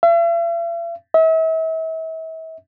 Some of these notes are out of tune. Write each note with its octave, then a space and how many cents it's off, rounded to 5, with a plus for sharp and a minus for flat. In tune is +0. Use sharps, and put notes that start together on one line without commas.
E5 +45
E5 -40